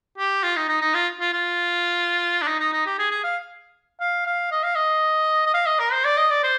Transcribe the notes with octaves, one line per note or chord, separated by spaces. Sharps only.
G4
F4
D#4
D#4
D#4
F4
F4
F4
D4
D#4
D#4
D#4
G4
G#4
G#4
F5
F5
F5
D#5
F5
D#5
D#5
F5
D#5
A#4
C5
D5
D#5
D5
C5